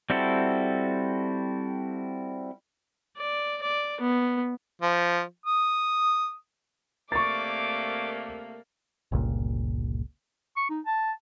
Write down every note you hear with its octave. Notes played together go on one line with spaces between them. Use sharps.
G3 C4 E4 F#4 A4
D5
D5
B3
F3
D#6
C3 A3 A#3 D5 C#6 D6 A6
G1 C#2 A#2
C#6
D#4
A5